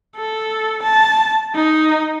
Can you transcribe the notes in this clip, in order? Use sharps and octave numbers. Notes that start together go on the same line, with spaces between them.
A4
A5
D#4